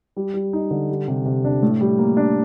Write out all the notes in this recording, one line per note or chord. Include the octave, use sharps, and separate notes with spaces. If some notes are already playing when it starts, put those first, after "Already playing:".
G3
G3
D#4
D3
G3
C3
C3
D4
A2
G3
A#3
D4